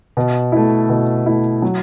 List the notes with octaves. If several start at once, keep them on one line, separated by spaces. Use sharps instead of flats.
B2
A3 E4
B2
A3 E4
F#3